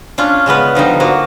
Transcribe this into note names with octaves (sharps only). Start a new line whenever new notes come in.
C#4 D4 F4
C#3 G#3 B3 B4
D3 F3 G3 D#4
F3 A#3 F#4